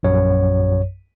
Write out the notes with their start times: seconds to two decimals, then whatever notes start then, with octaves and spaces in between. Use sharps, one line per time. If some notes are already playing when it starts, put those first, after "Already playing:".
0.03 A#1 F#2 C#5